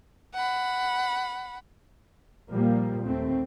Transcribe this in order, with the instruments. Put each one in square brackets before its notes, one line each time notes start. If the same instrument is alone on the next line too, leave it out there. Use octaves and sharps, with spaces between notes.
[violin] F#5 B5
[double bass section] A#2 F3 G3 A#3
D#2 A3 C4